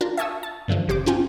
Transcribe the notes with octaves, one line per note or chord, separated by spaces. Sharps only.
D4 F4 A#4
E5 G#5 A5 C#6 D#6 E6
A5
G2 D3 E3 F3
G1 C#3 G4 C5 D6
C4 C#4 F4 G5 G#5